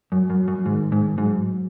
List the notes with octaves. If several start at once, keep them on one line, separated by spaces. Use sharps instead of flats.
F#2 F#3
F#2
F#2
G#2 D#3
G#2
G#2 F#3